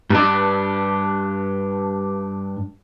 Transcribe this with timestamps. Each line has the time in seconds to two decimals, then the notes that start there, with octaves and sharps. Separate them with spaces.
0.10 G2 D4